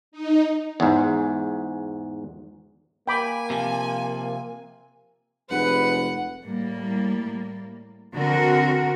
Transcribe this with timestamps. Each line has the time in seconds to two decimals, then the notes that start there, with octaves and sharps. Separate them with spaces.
0.12 D#4
0.80 E2 G#2
3.08 A#3 G5 G#5 B5 D6
3.50 C3 F3
5.50 F1 G#3 B4 F#5
6.44 A2 G3 A#3
8.14 D3 C4 F#4 A#4